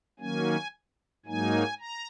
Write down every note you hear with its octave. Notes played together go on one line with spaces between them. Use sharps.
D#3 F#3 A#3 C#4 G#5
G#2 F#3 A#3 D#4 G#5
A#5